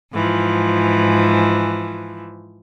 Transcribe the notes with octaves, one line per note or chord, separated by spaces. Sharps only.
G#2 E3 F3